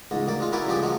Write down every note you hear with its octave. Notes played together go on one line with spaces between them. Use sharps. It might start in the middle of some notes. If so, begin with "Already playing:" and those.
C#2 G#2
D2 A#3 D5
G#3 F4
F#3 A#3 C#4 E4 B4 D5
C#2 G2 F3 G4 G#4 D5
F3 F#3 G#3 A3